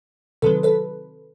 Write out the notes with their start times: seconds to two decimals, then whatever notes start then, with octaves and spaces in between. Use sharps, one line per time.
0.42 C3 D#3 F#3 A4 B4
0.63 A4 B4